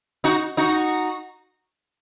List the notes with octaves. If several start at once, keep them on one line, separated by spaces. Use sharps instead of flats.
D#4 F#4
D#4 F#4